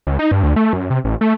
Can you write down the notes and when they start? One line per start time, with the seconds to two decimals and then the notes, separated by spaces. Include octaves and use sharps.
0.07 C#2
0.19 D#4
0.31 G2
0.43 D2
0.56 A3
0.73 F#2
0.90 C3
1.04 A1
1.21 A3